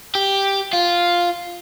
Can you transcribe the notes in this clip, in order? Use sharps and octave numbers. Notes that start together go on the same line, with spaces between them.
G4
F4